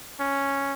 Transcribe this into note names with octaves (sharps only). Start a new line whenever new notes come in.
C#4